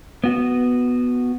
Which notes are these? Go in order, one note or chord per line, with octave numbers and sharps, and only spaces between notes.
B3 F#4